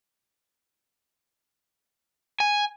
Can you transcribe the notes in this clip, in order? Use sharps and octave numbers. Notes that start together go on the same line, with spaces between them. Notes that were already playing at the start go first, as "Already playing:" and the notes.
G#5